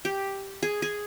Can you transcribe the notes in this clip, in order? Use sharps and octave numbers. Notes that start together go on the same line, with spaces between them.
G4
G#4
G#4